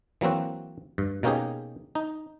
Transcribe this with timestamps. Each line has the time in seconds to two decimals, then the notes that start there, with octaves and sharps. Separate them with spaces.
0.21 E3 F#3 A#3 C4 F#4
0.98 G2
1.23 B2 A#3 C#4 D#4 G4 G#4
1.95 D#4